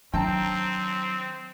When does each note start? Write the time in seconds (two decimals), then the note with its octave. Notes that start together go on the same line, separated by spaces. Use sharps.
0.13 D#3 F#3 C4 D4 G5 A5 A#5